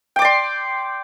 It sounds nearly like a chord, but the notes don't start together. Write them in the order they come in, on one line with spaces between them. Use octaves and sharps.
G5 D6 D5 C6